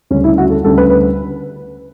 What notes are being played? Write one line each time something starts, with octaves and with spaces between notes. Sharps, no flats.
D2 C#3 G3 C#4
E4
F#4
A4
D2 C#3 G3 A4
B4
B4